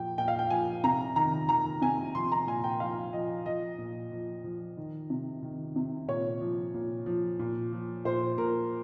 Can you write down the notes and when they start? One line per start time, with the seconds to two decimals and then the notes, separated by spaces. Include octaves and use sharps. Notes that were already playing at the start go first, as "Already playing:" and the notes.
Already playing: A#2 F3 G5
0.18 A#2 G5
0.28 F5
0.39 G5
0.50 F3 G#5
0.84 C3 A#5
1.16 D#3 A#5
1.49 D#3 A#5
1.82 C3 G#5
2.15 F3 C6
2.32 A#5
2.47 A#2 G#5
2.64 G5
2.80 F3 F5
3.13 F3 D#5
3.46 F3 D#5
3.78 A#2
4.12 F3
4.44 F3
4.77 D#3
5.10 C3
5.43 D#3
5.76 C3
6.08 A#2 C#5
6.41 F3
6.74 A#2
7.06 F3
7.39 A#2
7.72 F3
8.05 A#2 C5
8.37 A#2 A#4